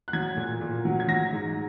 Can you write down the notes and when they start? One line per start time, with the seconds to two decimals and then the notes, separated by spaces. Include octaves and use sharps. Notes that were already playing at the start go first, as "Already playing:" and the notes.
0.08 F#6
0.13 F#3 G#6
0.37 A#2
0.61 A#2
0.85 F#3
1.00 G#6
1.08 F#3 A#6
1.32 G#2